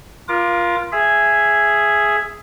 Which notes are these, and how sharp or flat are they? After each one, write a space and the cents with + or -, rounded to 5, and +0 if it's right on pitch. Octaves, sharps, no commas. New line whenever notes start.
F4 -5 A#4 +30 D6 +20
G#4 +0 E5 +10